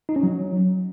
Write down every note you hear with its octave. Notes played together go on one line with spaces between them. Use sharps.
D#4
C#4
F#3